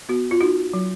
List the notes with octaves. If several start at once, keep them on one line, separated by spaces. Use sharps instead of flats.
B3 F#4
F4
D#4 F#4
F#3